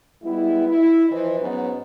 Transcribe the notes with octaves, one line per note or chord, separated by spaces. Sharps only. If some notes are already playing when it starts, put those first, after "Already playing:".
G3 G#3 B3 E4
E4
E3 F3 B4 C5 D#5
G#2 F#3 B3 C#4